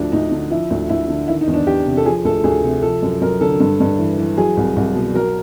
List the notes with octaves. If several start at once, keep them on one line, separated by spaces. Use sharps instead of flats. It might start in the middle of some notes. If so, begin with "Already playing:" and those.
Already playing: D2 F3 D4
D2 D#4
D3
F3 E4
D2
D2 E4
D3
D#3 E4
D#4
E2
D4
E2 G4
C3
A4
F3 G#4
D2 A4
D2 G#4
C3
F3 A4
F#2
F#2 A#4
D3 A4
G2
G2
E3
E3
F#3 G#4
C2
C2
B2
F#3 A#4